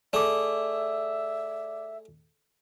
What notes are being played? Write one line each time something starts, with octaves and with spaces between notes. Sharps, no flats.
A3 G#4 D5 E5 D6